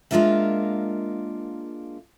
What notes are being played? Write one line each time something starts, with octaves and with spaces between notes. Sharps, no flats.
G#3 A#3 D4 F4 A#4 E5